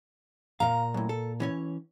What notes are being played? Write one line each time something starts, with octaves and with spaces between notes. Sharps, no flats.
A#2 F5 A#5
F#2 A2
A4
E3 C#4 C#5